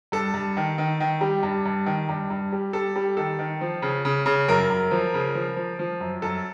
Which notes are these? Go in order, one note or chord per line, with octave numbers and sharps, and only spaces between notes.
G2 A4
G2
D#3
D#3
D#3
G3
G2
G2
D#3
G2
G2
G3
G3 A4
G3
D#3 A4
D#3
F3
C#3
C#3
C#3
F#2 A#4
F#2
F3
C#3
F3
F3
F3
F#2
F#2 A4